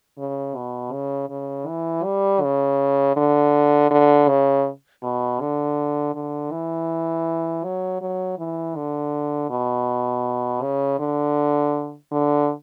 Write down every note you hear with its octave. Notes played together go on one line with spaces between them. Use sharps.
C#3
B2
C#3
C#3
E3
G3
C#3
D3
D3
C#3
B2
D3
D3
E3
F#3
F#3
E3
D3
B2
C#3
D3
D3